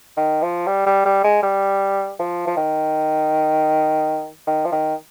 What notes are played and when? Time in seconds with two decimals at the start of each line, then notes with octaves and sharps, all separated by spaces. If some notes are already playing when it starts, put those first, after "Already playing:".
0.17 D#3
0.43 F3
0.67 G3
0.87 G3
1.05 G3
1.24 G#3
1.43 G3
2.19 F3
2.47 F3
2.57 D#3
4.47 D#3
4.65 F3
4.72 D#3